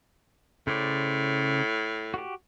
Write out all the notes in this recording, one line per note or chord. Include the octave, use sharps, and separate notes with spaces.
A2 C#3 C5 D5
F#4 G4